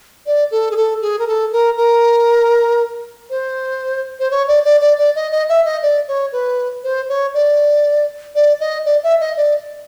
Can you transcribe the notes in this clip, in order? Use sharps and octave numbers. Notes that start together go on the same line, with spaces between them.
D5
A4
G#4
A4
G#4
A#4
A4
A#4
A#4
C5
C5
C#5
D5
D5
D5
D5
D#5
D#5
E5
D#5
D5
C#5
B4
C5
C#5
D5
D5
D#5
D5
E5
D#5
D5